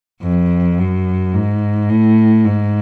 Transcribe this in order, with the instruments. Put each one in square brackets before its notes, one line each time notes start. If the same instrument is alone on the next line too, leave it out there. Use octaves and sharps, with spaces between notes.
[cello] F2
F#2
G#2
A2
G#2